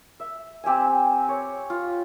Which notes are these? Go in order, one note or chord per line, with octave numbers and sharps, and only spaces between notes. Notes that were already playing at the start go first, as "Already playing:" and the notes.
E5
C4 G4 E5 G#5
C#5
F4